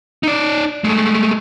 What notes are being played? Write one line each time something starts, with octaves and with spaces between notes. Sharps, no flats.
D#4 D5
G#3 A3